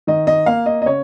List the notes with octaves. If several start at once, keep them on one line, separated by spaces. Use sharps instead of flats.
D#3 D#5
D#5
A#3 F5
D#5
D#5
C#3 C#5